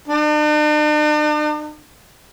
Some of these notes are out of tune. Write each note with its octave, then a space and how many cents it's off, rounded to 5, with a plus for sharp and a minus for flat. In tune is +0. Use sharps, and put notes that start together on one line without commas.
D4 +45